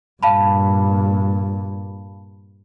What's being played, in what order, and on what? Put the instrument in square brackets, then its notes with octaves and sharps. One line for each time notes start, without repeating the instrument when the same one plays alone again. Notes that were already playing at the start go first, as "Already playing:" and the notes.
[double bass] G2 A#2 [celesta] F5 A5 B5